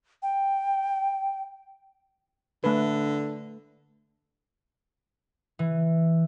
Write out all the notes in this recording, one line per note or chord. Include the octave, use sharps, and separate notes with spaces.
G5
D3 A3 B4
E3